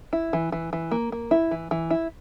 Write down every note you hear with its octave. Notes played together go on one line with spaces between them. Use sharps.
E4
E3
E3
E3
A#3
A#3
E4
E3
E3
E4